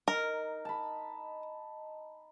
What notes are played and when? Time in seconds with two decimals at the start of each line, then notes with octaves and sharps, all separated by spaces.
0.08 D#4 A#4
0.65 A5 B5